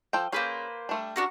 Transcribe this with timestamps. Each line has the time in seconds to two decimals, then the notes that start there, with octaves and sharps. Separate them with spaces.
0.13 F3 A4 G5
0.32 A#3 C#4 G#4 B4 C5
0.89 G3 A3 D4
1.16 D4 F#4 A#4